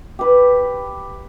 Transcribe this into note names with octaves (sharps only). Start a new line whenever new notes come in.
G4 B4